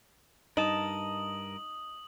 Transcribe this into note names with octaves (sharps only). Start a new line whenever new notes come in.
G2 D#4 A#4 D#5 A5 D#6 F#7